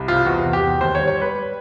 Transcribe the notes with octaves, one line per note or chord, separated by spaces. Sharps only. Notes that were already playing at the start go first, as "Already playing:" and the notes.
Already playing: C2
C3 F4
E2 F#4
E2
G4
E2
D#2 C5
C#5
G3
C#5
G3 B4
G3